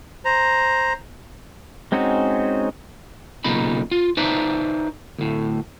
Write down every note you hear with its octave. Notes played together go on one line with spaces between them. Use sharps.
C5 A#5
G#3 C4 C#4 D#4 F#4
B1 A#2 C#3 D#4 B5
F4
D#4 B4 C5 D5 E5 A5
D2 A2